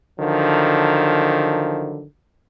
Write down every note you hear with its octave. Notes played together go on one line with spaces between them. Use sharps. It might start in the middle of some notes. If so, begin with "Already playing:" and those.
D3 D#3 F3 F#3